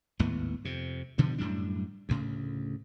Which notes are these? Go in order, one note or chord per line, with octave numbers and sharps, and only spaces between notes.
G#1 D#2 A2 B3
F2 C3
G2 B2 D3 F3
F#2 A2 G3 D4
D2 A2 C#3